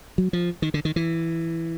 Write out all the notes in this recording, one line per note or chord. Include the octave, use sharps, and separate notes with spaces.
F#3
F3
D#3
D3
D#3
E3